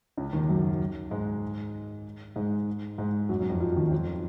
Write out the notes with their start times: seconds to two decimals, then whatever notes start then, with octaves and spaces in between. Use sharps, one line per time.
0.18 C#2 C#3
0.33 D#2 D#3
0.49 F#2 F#3
1.11 G#2 G#3
2.36 G#2 G#3
2.98 G#2 G#3
3.29 F#2 F#3
3.40 F#2 F#3
3.50 F2 F3
3.60 F2 F3
3.76 D#2 D#3
3.92 F2 F3